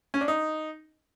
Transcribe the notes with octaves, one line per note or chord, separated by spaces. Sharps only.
C#4
D4
D#4